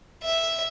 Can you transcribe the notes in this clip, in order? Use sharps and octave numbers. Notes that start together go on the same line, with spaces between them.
E5